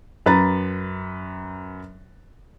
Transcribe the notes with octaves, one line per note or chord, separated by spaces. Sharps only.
F#2 B4 A#5 A6